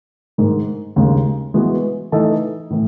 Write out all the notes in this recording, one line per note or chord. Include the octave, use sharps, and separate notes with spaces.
G#2 D#3 G#3
D#2 C#3 G#3
E3 G#3 B3 F#4 B4
E3 A3 D#4 A4 D#5
A2 E3